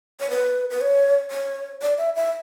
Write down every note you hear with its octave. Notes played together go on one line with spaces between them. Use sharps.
C#5
B4
B4
C#5
C#5
D5
E5
E5